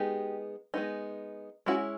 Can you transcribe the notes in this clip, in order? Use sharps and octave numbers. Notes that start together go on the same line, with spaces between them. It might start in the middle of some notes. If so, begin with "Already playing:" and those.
Already playing: G#3 B3 D#4 G4
G#3 B3 D#4
G#3 C#4 E4 F#4